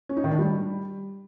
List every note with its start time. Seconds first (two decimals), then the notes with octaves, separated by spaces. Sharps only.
0.09 C#4
0.17 D#4
0.24 D#3
0.31 D4
0.38 G3